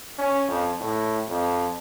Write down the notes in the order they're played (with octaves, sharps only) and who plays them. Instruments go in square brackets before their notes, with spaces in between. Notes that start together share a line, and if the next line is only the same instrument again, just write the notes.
[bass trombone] C#4
F2
A2
F2